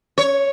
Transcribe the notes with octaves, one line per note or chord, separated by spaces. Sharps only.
C#5